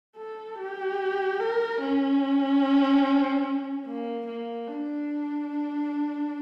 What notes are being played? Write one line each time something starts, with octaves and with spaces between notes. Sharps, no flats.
A4
G4
A#4
C#4
A#3
A#3
D4